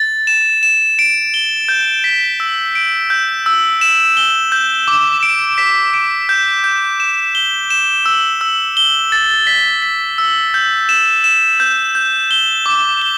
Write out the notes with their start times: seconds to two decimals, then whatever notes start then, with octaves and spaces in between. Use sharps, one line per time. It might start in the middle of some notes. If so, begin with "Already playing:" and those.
Already playing: A6
0.27 E7
0.63 E7
0.99 D7
1.34 G7
1.68 G6
2.04 B6
2.40 E6
2.75 D7
3.10 G6
3.46 E6
3.81 E7
4.17 G7
4.52 G6
4.88 D6
5.23 D7
5.58 B6
5.94 D7
6.29 G6
6.64 G6
7.00 E7
7.35 G7
7.70 E7
8.06 E6
8.41 E6
8.77 G7
9.12 A6
9.47 B6
9.82 B6
10.18 E6
10.54 G6
10.89 E7
11.24 E7
11.60 G6
11.95 G6
12.31 G7
12.66 D6
13.02 G7